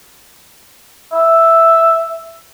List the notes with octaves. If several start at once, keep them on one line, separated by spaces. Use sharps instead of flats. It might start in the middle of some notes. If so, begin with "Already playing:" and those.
E5